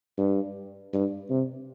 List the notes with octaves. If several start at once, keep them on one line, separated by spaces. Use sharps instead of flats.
G2
G2
C3